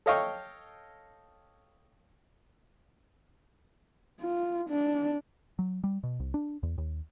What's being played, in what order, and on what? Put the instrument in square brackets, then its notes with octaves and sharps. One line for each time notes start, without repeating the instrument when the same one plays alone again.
[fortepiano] A4 C#5 D#5 F5 G5 C#6
[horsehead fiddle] F4
D4
[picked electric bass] F#3
G3
B2
C2
D4
E2
D#2